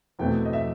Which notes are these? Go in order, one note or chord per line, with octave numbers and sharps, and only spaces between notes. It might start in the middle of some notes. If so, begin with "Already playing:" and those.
E2 B2 A3 C4 G5
D#5
E5